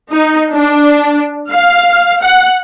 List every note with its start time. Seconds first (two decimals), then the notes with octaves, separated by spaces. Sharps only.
0.11 D#4
0.53 D4
1.50 F5
2.22 F#5